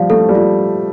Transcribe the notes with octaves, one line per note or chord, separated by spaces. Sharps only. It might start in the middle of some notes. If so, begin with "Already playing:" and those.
Already playing: F3 G3 C5 F5
A3 A4
G3
F4